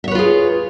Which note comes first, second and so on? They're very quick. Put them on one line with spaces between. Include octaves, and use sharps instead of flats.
E5 C#5 B4 F4 G#4